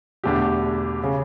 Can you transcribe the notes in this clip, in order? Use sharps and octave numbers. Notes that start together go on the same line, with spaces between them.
E1 E2 D3 A3 D4 G4
C#3